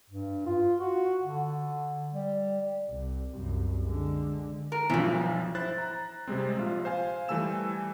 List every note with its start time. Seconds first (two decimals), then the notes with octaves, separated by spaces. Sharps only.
0.10 G2
0.46 F4
0.78 F#4
1.23 D3
2.14 G3
2.88 C2
3.31 C2 F#2
3.84 D3 G#3
4.72 A#4
4.90 B1 G2 E3 F3
5.55 E4 C5 F#6 A6
5.78 A#5
6.28 C3 G3 G#3 C4
6.57 A#1 F4
6.85 C5 F5 G#5
7.28 E3 G3 A3 G#5 E6 E7